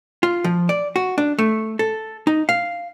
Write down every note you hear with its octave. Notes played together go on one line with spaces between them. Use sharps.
F4
F3
D5
F#4
D4
A3
A4
D#4
F5